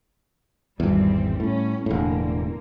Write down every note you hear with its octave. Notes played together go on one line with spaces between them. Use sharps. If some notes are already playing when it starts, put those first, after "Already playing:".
G#1 E2 G3 C4
A2 C#4
E1 A2 D3 A#3